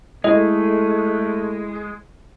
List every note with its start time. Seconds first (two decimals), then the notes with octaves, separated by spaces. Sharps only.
0.24 G#3 A3 E4 A4 D#5